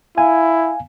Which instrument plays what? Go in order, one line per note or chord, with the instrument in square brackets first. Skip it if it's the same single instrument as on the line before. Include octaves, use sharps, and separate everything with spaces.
[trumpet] E4 [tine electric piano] F5 G#5